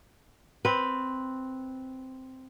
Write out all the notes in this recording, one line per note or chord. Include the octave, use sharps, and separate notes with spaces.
C4 B4